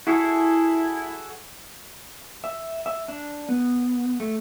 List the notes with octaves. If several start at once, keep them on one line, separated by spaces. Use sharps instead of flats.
E4 F#4 G#4 A4
E5
E5
D4
B3
A3